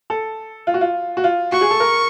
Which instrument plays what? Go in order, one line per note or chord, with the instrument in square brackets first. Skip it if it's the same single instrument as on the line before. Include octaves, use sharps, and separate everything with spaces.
[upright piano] A4
F4
F#4
F4
F#4
F4
[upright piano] F#4 [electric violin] C#6
[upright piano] G#4
A4
A#4